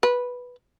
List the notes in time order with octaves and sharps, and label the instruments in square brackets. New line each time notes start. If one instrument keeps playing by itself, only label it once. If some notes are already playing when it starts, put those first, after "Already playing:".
[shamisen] B4